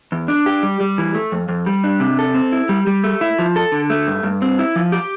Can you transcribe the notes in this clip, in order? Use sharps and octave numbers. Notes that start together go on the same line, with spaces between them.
E2
D4
G4
G3
G3
E3
A3
F2
F2
G3
D4
C3
A4
C4
E4
G3
G3
A3
E4
F3
A4
D3
A3
G2
G2
C4
E4
F3
G4